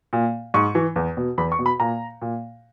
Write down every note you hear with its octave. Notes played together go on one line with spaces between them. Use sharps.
A#2
G#2 C#6
E3
E2
B2
E2 B5
C#6
B2
B5
A#2 A#5
A#2